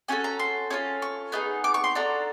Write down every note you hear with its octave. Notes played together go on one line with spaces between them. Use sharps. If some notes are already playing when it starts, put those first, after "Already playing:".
C#4 F#4 A4 G#5
A#5
C6
C#4 F4 A4
C#6
B3 D#4 G#4
D6
C#6
C6
D4 F#4 A4 A#5